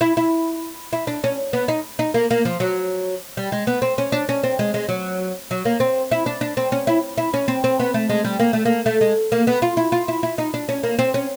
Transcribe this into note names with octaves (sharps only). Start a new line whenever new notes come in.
E4
E4
E4
D4
C#4
B3
D#4
D#4
A#3
A#3
F3
F#3
G3
G#3
B3
C4
C#4
D4
C#4
C4
G#3
G#3
F#3
F#3
A#3
C4
E4
D4
D4
C4
C#4
E4
E4
C#4
C4
C4
B3
A3
G#3
G3
A#3
A3
A#3
A3
G#3
A#3
B3
F4
E4
F4
E4
E4
D#4
D4
C#4
A#3
C4
C#4